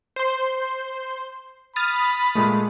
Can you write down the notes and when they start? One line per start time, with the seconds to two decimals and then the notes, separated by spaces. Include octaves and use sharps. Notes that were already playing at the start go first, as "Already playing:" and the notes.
0.16 C5 C6
1.76 B5 D#6 F6 A6
2.35 A#2 G#3 A3